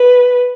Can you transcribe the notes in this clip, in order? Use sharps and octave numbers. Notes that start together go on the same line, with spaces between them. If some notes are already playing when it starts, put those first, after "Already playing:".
Already playing: B4